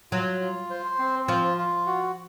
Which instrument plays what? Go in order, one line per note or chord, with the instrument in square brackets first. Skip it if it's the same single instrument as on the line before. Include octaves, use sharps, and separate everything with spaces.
[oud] F#3 [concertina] F4
[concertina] F4
C5
C4
[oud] F3 [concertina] F4
[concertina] F4
F#4